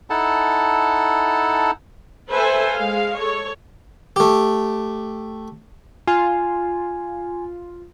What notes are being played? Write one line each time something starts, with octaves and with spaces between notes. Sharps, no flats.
D#4 E4 A4 F#5 A5
A4 B4 C5 E5 G#5
G#3 F5
A4 C#5
A3 G4
F4 G#5